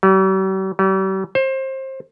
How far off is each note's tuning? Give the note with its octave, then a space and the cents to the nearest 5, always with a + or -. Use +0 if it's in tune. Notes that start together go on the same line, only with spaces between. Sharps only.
G3 -45
G3 -40
C5 +25